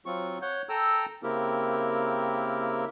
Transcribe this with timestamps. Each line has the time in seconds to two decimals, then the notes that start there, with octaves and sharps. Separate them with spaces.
0.06 F#3 C4 F4 C#6
0.42 C#5 F#5 G6
0.69 A4 G5 A#5 E6
1.23 C#3 A#3 C4 E4 G4 A#4